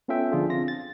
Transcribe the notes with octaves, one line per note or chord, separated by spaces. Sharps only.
B3 C#4 F4 A4 E5 G5
D3 F3 D4 F4 G#4
C4 F4 A#6
A6